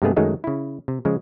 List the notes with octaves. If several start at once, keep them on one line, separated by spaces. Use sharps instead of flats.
G2 C3 G#3 A3 B3 G#4
F#2 D#3 F#3 G#3 A3 D#4
C#3 E4
C3
C#3 F3 G#3